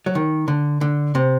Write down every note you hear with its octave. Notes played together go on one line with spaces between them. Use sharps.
F#3
D#3
D3
D3
C3